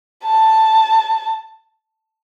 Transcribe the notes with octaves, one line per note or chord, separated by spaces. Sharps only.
A5